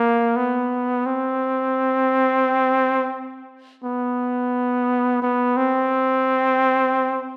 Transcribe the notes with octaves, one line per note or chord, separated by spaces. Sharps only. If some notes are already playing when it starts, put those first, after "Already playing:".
Already playing: A#3
B3
C4
B3
B3
C4